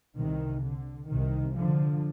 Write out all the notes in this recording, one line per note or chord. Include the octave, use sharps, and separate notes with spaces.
C2 C3 D#3
D3
C2 C3 D#3
D3 F3